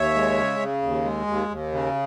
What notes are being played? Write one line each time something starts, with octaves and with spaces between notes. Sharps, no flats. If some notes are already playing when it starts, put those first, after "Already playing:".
Already playing: D#2 C#5 E5
G#3
C#3
C#3
D#2
G#3
D#2
D#2
C#3